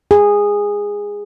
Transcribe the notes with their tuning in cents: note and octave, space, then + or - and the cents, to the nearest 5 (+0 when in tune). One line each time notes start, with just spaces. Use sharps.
G#4 -15